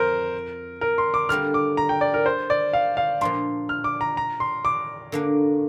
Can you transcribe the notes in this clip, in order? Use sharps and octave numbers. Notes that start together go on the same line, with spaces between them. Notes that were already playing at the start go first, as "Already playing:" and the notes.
Already playing: F2 A#4 C5
A#4
C6
D6
D3 G3 A#3 F6
D6
A#5
G5
D5
A#4
C5
D5
F5
F5
A#2 F3 D4 C6
F6
D6
A#5
A#5
C6
D6
D3 A#3 D4